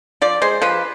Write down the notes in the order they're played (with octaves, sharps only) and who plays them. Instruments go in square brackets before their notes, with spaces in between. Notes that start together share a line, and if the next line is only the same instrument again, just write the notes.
[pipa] F3 D5
G#3 C5
F3 B4